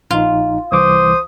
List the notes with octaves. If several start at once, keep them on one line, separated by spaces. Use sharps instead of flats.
A#1 D#4 F4
C2 E3 C5 D6 D#6